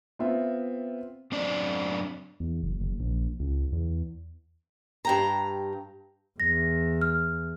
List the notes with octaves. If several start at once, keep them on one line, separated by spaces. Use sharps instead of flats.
B3 C4 F4 E5
F#2 C4 D4 D5
E2
F#1
F#1
A#1
C#2
E2
G2 G4 A#5
E2 A#6
F6